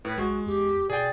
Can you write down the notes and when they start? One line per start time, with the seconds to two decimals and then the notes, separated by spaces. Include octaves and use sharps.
0.05 A2 B4
0.18 B1 G#3 F#4
0.46 E2 G4
0.90 B2 G#4 D5 G5